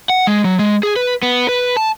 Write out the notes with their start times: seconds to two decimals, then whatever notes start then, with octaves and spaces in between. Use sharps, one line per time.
0.10 F#5
0.27 G#3
0.44 F#3
0.59 G#3
0.83 G#4
0.96 B4
1.22 B3
1.49 B4
1.77 A5